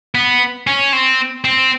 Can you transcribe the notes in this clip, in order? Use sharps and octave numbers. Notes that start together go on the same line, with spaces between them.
B3
C#4
C4
C4